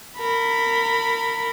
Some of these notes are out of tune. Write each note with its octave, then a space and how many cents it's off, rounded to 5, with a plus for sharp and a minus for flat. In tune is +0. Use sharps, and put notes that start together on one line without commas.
A#4 -25 B5 +0